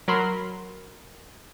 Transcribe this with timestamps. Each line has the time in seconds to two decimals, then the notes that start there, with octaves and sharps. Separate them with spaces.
0.08 F#3 A#4 B5 C6